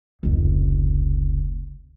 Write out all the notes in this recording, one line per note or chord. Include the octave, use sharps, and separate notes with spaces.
F1 C#2